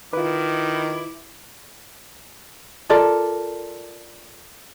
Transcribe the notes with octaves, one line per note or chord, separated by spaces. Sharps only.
D#3 E4 F4 B4 D6
F4 A4 A#4 D5